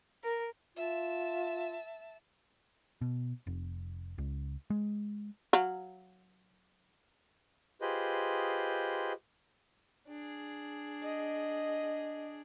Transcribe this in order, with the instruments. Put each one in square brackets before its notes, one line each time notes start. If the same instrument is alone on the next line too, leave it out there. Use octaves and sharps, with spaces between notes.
[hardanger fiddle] A#4
[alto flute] F4 [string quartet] E5 A5
[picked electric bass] B2
F1
C#2
G#3
[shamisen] F#3 F5
[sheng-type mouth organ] F4 G4 G#4 B4 C5 D#5
[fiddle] D4 G#4
[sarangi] D#5